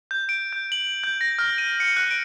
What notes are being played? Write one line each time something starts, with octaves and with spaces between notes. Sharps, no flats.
G6
D7
G6
F#7
G6
A#6
F6
D#7
C#7
F#6
D7